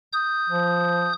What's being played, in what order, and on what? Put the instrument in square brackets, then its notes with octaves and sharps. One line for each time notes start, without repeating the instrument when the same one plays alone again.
[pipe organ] D#6 G6
[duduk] F3